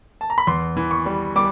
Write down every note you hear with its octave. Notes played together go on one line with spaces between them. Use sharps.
A5
A#5
B5
E2 C6
E3
C#6
G3
G3 D6